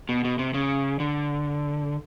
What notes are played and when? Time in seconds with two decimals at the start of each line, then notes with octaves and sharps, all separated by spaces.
0.09 B2
0.24 B2
0.39 C3
0.54 C#3
1.00 D3